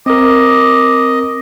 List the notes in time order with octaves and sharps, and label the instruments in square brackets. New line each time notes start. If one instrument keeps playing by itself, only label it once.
[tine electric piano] C4 A#4 [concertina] D#5 [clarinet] D6